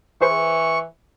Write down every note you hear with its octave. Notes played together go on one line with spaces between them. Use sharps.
E3 G#4 B4 C5 C#6